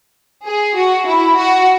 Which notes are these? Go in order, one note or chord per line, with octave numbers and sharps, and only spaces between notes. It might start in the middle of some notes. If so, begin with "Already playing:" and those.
G#4
F#4
E4
F#4